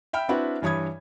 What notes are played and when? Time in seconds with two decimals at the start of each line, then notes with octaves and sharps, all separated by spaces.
0.13 E5 G5 B5 F6
0.29 C4 D4 E4 F#4 B4
0.62 G2 E3 C#5 B5 D#6 G#6